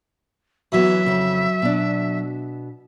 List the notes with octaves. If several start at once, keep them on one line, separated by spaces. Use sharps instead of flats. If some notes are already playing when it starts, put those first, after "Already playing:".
F#2 E3 F#3 B3 E5
F2 C#3
B2 D4